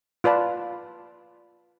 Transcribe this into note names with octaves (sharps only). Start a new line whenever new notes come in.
F4 B4 D5 A5